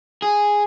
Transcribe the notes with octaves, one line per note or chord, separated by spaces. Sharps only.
G#4